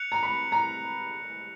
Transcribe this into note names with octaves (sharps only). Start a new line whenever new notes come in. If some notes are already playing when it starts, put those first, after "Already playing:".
Already playing: F#6 C#7 F7
A#5
B5
A#5